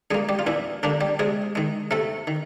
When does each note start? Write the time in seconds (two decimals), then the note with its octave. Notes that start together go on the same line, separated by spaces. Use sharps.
0.11 G3 G#3 G#4
0.14 A#3
0.29 G3 G4
0.39 F4
0.47 A#2 E3 E4
0.83 D3 G3 A#3 D4
1.01 G3 G4
1.19 C3 G#3 G#4
1.55 D#3 G#3
1.91 C3 A3 A4
2.27 D#3